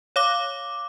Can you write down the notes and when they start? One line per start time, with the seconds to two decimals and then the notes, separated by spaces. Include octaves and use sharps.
0.16 C#5 F5 D6